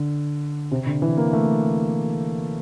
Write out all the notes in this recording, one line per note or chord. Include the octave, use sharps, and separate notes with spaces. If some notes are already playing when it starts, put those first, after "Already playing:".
Already playing: D3
C3
D3
E3
A#3
A3